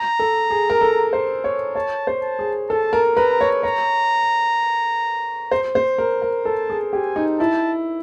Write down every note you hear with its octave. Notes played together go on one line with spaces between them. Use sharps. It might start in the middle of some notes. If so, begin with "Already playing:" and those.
Already playing: A#5
A4
G#4
A#4
A4
C5
C#5
C#5 A5
C5
A5
G#4
A4 A5
A#4
B4 A#5
C#5
C#5 A#5
C5
C5
A#4
A#4
A4 A5
G#4
G4 G#5
D#4
E4 A5